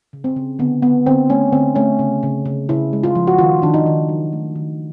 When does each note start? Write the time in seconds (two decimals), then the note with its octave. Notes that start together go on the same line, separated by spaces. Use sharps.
0.13 C#3
0.24 C4
0.36 C#3
0.59 D3 B3
0.82 D3 B3
1.06 D3 C4
1.29 A3 C#4
1.53 D3 C4
1.76 A3 C#4
1.99 C#3
2.23 C#3
2.46 C#3
2.69 C#3 E4
2.93 G#3
3.04 F4
3.15 F3
3.27 F#4
3.38 D#3 F4
3.62 D#3 D4
3.74 D#4
3.86 D#3
4.09 F#3
4.33 A3
4.56 D#3